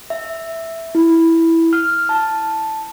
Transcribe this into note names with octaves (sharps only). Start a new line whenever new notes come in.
E5
E4
F6
A5